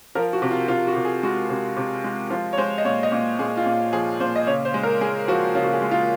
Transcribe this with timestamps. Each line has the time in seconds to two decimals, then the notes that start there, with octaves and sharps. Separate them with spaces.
0.15 F3 A#4
0.33 F#4
0.42 C3
0.51 F4
0.68 C3 F4
0.87 F#4
0.96 C3
1.05 G#4
1.23 G#3 F#4
1.49 C3
1.77 C3
2.04 G#3
2.30 F3 F4
2.53 C#5
2.57 G#3 C5
2.78 D#5
2.85 A#2 C#5
3.03 D#5
3.12 A#2
3.39 A#2 G#4
3.57 F4
3.66 A#2
3.93 F3 G#4
4.20 A#2 C5
4.36 D#5
4.47 C#3 C#5
4.65 C5
4.74 G#3
4.83 A#4
5.01 G#3 G#4
5.28 F3 F#4
5.55 C#3 F4
5.64 F#4
5.73 G#4
5.82 G#3
5.91 F4